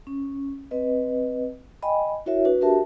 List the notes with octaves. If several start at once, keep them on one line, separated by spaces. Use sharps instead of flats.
C#4
C4 B4 D#5
D#5 G5 G#5 B5
E4 F#4 A#4 C#5 E5
D4 F#4 B4
D4 F#4 G4 A#4 E5 A5